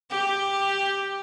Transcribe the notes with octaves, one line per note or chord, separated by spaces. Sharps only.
G4